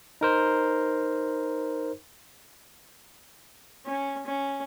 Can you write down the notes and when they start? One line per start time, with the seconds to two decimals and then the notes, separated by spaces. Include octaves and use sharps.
0.21 D#4 A#4 C5
3.86 C#4
4.26 C#4